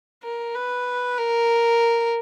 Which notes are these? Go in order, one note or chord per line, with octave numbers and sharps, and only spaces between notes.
A#4
B4
A#4